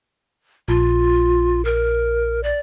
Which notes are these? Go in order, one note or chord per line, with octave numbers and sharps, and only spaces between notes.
A#1 F4
A#4
D5